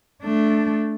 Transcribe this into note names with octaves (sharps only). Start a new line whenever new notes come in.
A3 D4